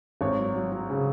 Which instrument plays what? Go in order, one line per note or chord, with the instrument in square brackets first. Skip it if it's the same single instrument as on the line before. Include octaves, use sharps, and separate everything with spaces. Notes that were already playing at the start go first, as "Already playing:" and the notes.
[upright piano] G#1 C#5
F#3
F#3
F#3
C#3